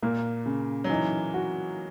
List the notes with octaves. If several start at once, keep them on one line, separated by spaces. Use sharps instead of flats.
A#2 A#3
C#3
F#3
E3 D#4
F#4